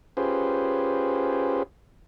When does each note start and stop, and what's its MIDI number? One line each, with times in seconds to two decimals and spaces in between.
0.17 1.63 61
0.17 1.63 65
0.17 1.63 67
0.17 1.63 68
0.17 1.63 71
0.17 1.63 72